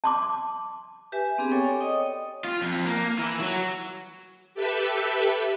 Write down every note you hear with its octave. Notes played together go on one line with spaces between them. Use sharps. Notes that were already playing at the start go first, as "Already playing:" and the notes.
A5 C6 D6
G4 B4 E5 G#5
B3 C4 D4 G4 G#4
D4 A4 C#5 G5 G#5 C#6
D5
C#5 D#5 G5 D#6
F4
F2
A#3
E3
F#3
G4 A4 B4 E5